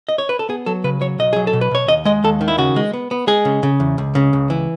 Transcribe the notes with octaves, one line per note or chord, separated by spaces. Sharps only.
D#5
C#5
B4
A4
B3 G#4
F#3 A4
C#3 B4
F#3 C#5
B1 D#5
F#3 G#4
A4
B2
B4
B2 C#5
D#2 D#5
G#3 D#5
D#2 A4
D#3
E4
C#3 F#4
G#3
B3
B3
G#3 G#4
C#3
C#3
E2
C#2
C#3
C#2
E3